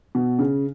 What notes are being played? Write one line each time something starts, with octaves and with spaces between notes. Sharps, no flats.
B2
C#3